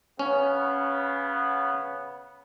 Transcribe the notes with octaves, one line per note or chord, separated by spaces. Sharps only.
C#3 B3 C#4